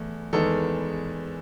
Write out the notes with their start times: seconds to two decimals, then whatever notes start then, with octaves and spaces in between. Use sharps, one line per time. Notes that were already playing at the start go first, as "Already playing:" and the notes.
Already playing: E2 A3
0.33 E2 D#3 G#3 B3 A4